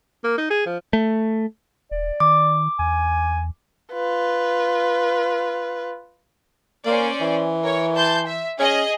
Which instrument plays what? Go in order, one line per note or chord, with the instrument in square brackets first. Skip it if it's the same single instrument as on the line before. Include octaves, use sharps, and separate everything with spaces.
[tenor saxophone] A#3
D#4
G#4
F3
[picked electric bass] A3
[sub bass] D#1 [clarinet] D5
[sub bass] D#3 [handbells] D6
[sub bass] E2 [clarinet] G#5
[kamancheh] F4 B4
[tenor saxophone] A#3 [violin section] C#4 C5 D5
[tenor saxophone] E3
[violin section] A#4 C#5
A5 C6 G6
E5
[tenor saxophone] C#4 [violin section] G#4 D#5